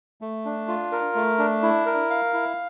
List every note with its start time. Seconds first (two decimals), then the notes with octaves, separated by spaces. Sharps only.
0.21 A3
0.45 D4
0.68 F4
0.92 A#4
1.15 A3
1.39 D4
1.63 E4
1.86 A#4
2.10 F5
2.34 E4